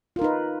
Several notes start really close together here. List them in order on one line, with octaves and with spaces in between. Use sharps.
F4 A#4 D#4 B4